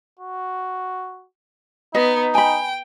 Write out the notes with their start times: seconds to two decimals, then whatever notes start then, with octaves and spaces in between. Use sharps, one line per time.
0.19 F#4
1.95 B3 D#4 D#5
2.35 G5 G#5 B5